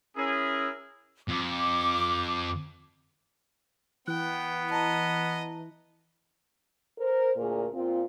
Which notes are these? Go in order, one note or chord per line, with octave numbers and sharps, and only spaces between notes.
C#4 E4 G#4 A#4
F2 D6
E3 B3 G5 F#6
D#5 A5 A#5
A#4 C5
D2 A#2 G#4 A#4
A#2 C4 F4